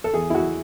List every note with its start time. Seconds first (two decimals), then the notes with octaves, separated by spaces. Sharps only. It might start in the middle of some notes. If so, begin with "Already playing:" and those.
0.04 A4
0.13 E2 G#4
0.30 E4
0.35 E2 F#4